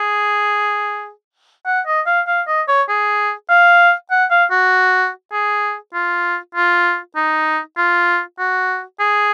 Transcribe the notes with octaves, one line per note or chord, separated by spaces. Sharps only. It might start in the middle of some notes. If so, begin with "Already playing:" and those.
Already playing: G#4
F#5
D#5
F5
F5
D#5
C#5
G#4
F5
F#5
F5
F#4
G#4
F4
F4
D#4
F4
F#4
G#4